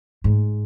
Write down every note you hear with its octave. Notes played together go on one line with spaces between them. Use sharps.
G#2